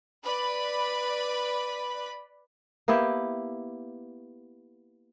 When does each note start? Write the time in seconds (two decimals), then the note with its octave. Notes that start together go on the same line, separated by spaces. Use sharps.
0.25 B4 D5 B5
2.88 A#3 B3 E4 G4